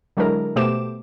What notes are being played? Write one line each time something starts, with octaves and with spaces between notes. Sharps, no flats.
D3 F#3 G#3 D4 E4 A#4
B2 A3 G4 C5 D6 E7